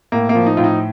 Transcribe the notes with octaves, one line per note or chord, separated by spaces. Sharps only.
A2 A#3
A#3
F3
D#4
A2 F4
D#4